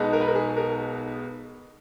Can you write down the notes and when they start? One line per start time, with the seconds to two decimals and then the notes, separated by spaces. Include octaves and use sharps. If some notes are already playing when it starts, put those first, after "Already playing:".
Already playing: B1 B2 G#3 B3 D#4
0.13 A#4
0.21 B4
0.28 A#4
0.35 G#4
0.57 A#4